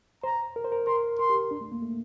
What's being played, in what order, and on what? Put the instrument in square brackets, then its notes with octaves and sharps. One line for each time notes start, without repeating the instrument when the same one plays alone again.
[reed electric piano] C5 [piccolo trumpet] A#5
[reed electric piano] A#4
C5
A#4
[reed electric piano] A#4 [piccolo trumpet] C6
[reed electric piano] A#4 [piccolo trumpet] C6
[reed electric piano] G4
D4
A3
A#3
A3